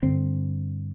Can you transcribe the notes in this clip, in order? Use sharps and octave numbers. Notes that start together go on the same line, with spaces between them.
G2 D3 C4